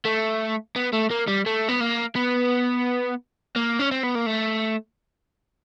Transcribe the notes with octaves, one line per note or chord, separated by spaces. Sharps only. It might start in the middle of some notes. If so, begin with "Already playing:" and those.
A3
B3
A3
A#3
G3
A3
B3
A#3
B3
A#3
C#4
C4
B3
A#3
A3